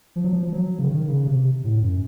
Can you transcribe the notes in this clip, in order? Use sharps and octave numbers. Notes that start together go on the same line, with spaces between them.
F3
F#3
F3
F3
F#3
C#3
D#3
C#3
C3
A2
F#2